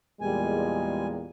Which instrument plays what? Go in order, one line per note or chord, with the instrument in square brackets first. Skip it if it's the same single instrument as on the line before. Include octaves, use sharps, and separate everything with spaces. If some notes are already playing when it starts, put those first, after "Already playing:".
[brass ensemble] E2 A#2 G#3 [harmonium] G3 G#5